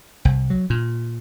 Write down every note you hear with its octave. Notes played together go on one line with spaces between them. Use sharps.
C2
F#3
A#2